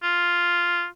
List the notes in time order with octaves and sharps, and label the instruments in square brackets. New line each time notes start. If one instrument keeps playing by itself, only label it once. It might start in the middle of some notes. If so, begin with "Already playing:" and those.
[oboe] F4